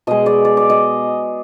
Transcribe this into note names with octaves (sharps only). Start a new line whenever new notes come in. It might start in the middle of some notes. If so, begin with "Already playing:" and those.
B2 G#3 D#5
D5
D5
D5
D#5